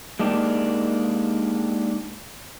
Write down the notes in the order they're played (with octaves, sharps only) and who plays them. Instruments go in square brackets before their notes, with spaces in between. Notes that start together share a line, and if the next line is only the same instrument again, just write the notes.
[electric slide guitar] G#3 A#3 D4 D#4 G4